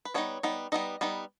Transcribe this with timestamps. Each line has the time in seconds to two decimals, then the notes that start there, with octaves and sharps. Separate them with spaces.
0.05 B4
0.14 G3 B3 D#4 C#5
0.43 G3 B3 D#4
0.72 G3 B3 D#4 D#5
1.01 G3 B3 D#4